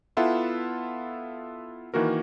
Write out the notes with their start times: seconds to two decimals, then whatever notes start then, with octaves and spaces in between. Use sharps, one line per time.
0.17 B3 E4 F4 A4 E5 F#5
1.94 D#3 E3 A#3 F#4 A#4